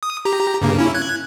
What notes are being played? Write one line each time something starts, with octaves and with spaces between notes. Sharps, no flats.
D#6
G4 A#5
G2 C#3 A#3
C#4 E4
F#6 G#6